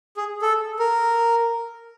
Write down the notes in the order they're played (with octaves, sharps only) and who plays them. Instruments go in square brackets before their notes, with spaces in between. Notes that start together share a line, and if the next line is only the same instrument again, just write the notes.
[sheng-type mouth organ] G#4
A4
A#4